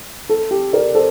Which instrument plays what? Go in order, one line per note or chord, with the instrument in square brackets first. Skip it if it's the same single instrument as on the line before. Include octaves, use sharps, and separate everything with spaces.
[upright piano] A4
G4
A#4 D5
A4 C5